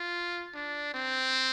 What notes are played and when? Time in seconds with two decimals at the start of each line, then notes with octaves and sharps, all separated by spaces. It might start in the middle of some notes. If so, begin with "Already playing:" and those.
Already playing: F4
0.55 D4
0.95 C4